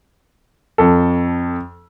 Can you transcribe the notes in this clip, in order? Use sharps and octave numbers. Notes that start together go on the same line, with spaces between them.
F2 A4